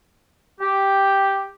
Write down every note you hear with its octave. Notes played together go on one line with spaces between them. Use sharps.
G4